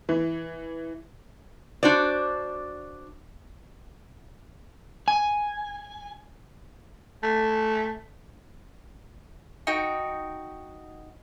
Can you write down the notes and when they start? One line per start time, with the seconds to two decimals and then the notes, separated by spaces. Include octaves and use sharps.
0.09 E3
1.83 D4 F#4 C5 D5
5.08 G#5
7.23 A3
9.67 D#4 F#4 G5